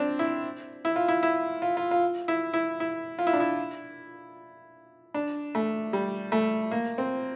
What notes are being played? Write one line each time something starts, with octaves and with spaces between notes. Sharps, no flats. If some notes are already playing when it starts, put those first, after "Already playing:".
Already playing: C4 D4
E4
E4
F4
E4
E4
F4
F4
F4
E4
E4
E4
F4
E4
D4
E4
D4
A3
G3
A3
A#3
C4